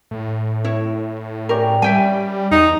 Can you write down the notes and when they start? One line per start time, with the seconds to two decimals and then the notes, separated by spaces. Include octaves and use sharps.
0.11 A2
0.64 E4 C#5
1.49 C#4 G4 A#4 D5
1.82 G3 E5 G5 G#5
2.51 E2 D#4